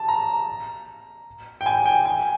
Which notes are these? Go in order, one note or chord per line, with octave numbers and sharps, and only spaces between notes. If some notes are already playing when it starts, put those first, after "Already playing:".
Already playing: A5
A#5
G5
G#5
G5
G#5